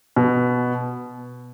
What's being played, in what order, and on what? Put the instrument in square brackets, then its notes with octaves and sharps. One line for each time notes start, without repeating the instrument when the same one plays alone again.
[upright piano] B2